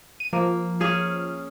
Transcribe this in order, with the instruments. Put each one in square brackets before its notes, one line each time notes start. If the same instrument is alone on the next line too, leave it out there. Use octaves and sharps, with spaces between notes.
[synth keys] D#7
[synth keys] F3 [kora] A#3
[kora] C#4 G#4 F5